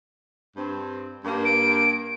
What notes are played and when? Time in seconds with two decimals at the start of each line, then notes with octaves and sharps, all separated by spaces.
0.57 G2 C4
1.25 G2 A#3
1.45 D7